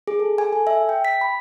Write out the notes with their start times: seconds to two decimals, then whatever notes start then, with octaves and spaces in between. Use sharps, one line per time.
0.07 G#4
0.19 A4
0.38 G#5
0.53 A4
0.67 E5
0.89 G5
1.05 B6
1.21 B5